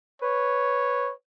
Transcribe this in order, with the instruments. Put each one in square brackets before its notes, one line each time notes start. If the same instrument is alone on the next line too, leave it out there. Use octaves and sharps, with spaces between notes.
[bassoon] B4 [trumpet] C#5